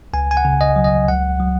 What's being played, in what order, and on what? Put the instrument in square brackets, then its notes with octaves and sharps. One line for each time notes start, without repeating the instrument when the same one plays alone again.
[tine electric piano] C#2 G#5
G#5
F#5
C#3
D#5
F#3
D#5
C#2 F#5
F#3